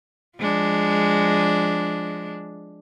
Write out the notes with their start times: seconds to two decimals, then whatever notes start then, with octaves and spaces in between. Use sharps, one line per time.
0.38 F3 G#3 D4